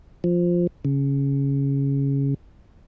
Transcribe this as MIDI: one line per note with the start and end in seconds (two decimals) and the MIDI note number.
0.24 0.67 53
0.85 2.34 49